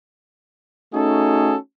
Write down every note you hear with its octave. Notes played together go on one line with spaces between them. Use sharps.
A3 C#4 D#4 F#4 G#4 A4